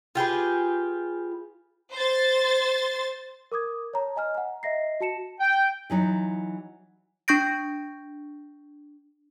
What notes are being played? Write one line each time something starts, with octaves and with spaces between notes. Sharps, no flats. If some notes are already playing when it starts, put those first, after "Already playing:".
F4 G4 G#4 B4
C5 A6
A#4 D6 D#6 G#6
C#5 A5 A#5
D#5 G#5 A#5 F6
F#5 A#5
D#5 E5 A#6 C7
F#4 A5 C#7 E7
G5
E3 F#3 D#4
D4 C#6 G6 A#6 D7